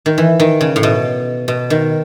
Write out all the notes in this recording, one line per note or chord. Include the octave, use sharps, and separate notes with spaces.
D#3
E3
D#3
C#3
A2
B2
B2
D#3